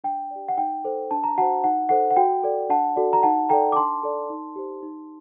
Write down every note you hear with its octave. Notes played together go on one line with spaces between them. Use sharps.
D4 G5
G4 D5
F#5
D#4 G5
A4 C5
D4 A5
A#5
F#4 C5 F#5 A5
D#4 F#5
A4 C5 F#5
F#5
F#4 G5
A4 D5
D4 F#5 A5
F#4 A4 D5
A#5
D#4 F#5 A5
A4 D5 G5 A#5
D6
D4 A5 C6
A4 D5
D#4
G4 C5
D#4